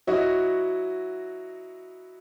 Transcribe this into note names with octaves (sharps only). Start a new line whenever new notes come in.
F#3 E4 F#4 D#5